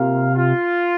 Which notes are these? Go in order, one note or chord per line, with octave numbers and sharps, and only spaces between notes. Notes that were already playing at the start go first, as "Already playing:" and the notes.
Already playing: C3 A#3 F4 A#4 F5
F4